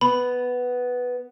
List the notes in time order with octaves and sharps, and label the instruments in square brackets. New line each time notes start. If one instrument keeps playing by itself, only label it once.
[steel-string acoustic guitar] B3 [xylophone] B5